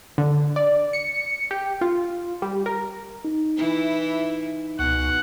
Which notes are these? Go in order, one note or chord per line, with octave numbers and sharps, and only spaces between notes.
D3
D5
C#7
G4
F4
G3
A#4
D#4
E3 E4
C#2 B2 F#5